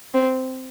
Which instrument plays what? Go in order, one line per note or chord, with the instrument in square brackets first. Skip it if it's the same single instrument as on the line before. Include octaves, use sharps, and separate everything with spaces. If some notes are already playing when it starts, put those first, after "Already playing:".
[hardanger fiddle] C4